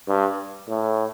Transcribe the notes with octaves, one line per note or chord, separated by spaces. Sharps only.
G2
A2